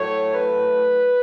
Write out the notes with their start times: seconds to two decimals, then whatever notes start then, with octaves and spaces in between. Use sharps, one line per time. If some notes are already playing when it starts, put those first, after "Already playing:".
Already playing: A2 F#3 A3 C#5
0.34 B4